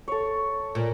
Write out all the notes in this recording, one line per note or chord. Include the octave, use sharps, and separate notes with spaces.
A4 C#5
A#2